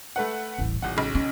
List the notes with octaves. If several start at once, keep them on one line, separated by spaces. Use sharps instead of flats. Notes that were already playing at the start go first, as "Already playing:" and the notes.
A3 B4 F#5
D#1 A1
D#1 A1 F#5
B1 C#3
C#4